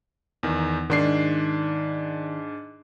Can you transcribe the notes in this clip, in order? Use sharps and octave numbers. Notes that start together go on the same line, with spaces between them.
E2 D#3
G#2 D#3 D4 C7